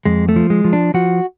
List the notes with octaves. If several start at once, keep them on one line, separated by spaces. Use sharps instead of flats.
F2 G#3
A3
F3
G#3
F3
D4
F3 F#4